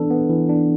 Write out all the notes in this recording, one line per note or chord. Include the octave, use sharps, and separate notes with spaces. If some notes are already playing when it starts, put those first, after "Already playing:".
Already playing: E3 B3 D4 A4
B3
E3
D4